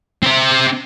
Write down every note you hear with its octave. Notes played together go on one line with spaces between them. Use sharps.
C4 E5